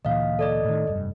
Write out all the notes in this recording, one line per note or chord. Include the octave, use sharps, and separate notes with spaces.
D2 A#2 E3 D#5 F5
A4 D5 D#5
A2 D#3
F1 G2